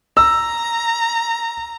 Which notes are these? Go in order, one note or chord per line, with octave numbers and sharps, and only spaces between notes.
A#5 E6